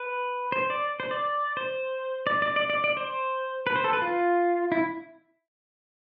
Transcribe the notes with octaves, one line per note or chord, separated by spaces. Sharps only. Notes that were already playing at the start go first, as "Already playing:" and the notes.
Already playing: B4
C5
D5
C5
D5
C5
D5
D5
D5
D5
D5
C5
B4
C5
A4
B4
F4
E4